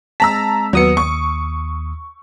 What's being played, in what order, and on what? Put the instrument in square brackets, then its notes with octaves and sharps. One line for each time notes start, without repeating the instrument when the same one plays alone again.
[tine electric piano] G#3 C4 B6 [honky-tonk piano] A5 A#5 E6
[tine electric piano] D#2 D#6 C#7 [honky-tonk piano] F#3 B3
[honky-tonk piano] C#6